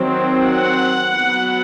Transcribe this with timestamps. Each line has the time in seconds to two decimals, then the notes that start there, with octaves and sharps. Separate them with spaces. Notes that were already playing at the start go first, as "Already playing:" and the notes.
Already playing: D#3 F#3 C4
0.43 F#5
1.08 F#3 B3